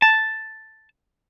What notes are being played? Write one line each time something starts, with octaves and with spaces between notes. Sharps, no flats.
A5